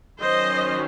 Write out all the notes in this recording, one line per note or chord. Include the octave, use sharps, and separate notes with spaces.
D#3 F#3 C#4 C5 D#5